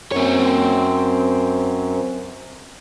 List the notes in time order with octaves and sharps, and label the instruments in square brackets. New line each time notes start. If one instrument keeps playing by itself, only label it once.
[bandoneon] F#2 [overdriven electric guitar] C4 C#5